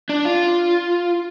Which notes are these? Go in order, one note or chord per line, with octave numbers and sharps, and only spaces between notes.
D4
F4